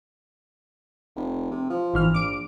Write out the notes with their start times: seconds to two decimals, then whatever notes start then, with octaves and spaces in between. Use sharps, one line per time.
1.16 F1
1.51 C3
1.70 F3
1.94 G#1 E3 F6
2.14 A#1 D6 D7